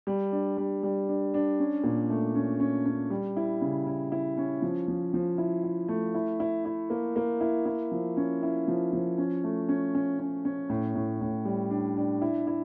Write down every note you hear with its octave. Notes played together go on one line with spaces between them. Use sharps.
G3
D4
G3
G3
D4
D4
C#4
A#2
A3
C#4
C#4
C#4
G3
E4
C#3
E4
E4
C#4
F3
F3
F3
E4
E4
A3
E4
E4
E4
A#3
A#3
E4
E4
F3
C#4
E4
F3
F3
C#4
A3
C#4
C#4
C#4
C#4
A2
A2
A2
G3
D4
D4
E4
E4